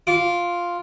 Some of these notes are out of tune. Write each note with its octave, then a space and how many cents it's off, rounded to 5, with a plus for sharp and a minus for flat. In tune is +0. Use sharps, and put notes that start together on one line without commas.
F4 +0 D6 -20